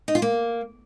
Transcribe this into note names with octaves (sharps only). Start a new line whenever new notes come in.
D#4
F4
A#3